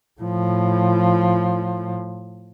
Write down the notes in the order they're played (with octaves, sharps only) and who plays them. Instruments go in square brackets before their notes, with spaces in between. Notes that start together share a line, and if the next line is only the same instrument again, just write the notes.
[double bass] A2 F3